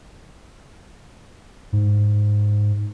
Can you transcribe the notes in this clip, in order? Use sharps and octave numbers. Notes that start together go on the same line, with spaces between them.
G#2